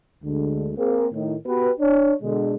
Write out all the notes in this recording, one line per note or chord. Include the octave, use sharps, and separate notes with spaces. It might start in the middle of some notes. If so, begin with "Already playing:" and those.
D2 D3 G#3
A#3 C4 G#4
A2 D#3
B3 F#4 G4 B4
D4 C#5
B2 D3 G#3